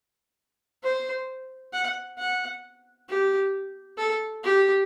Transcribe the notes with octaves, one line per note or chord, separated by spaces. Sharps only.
C5
F#5
F#5
G4
A4
G4